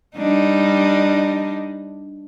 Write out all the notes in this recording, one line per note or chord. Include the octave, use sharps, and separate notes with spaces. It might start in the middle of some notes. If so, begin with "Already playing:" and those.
G3 D4 D#4